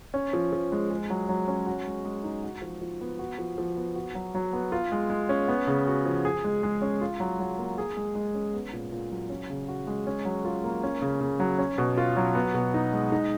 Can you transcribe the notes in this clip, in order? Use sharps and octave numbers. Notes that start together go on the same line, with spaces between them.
C#4
F3
F3
G#3
G#4
F#3
F#3
C#4
F#4
G#3
G#3
D#4
F#4
F3
F3
B3
F#4
F3
F3
B3
F#4
F#3
F#3
B3
F4
G#3
G#3
C#4
B3
C#3
F#4
F3
G#4
G#3
G#3
C#4
F4
F#3
F#3
A#3
G#4
G#3
G#3
C#4
B3
A#2
A#2
F#3
C#4
C#3
F#4
G#3
C#4
F#3
F4
A#3
C#4
C#3
C#3
F#3
C#4
B2
F4
F#3
B3
B2
D#4
G#3
D#4